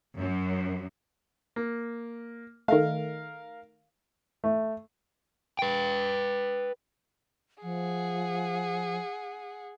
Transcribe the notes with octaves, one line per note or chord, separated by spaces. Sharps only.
F#2
A#3
D#3 A3 A#4 F5
A3
B4 G5
F3 G#4 F#5